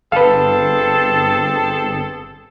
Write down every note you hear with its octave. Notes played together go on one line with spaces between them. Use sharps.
G1 C4 G#4 A4 B4 F5